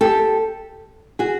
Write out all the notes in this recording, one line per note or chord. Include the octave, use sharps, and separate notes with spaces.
G4 A4
F#4 G#4